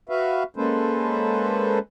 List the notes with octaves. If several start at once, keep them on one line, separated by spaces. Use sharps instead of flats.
F#4 B4 E5 F5
G#3 A#3 C#4 A4 B4 C5